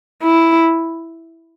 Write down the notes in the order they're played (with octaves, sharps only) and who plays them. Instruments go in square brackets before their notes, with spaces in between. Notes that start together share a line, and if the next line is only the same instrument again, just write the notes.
[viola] E4